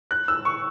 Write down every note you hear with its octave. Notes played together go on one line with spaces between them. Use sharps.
F#6
E6
C#6